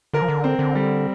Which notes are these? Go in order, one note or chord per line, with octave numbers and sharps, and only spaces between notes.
D3 A#4
F3
D3
C4
D3
G3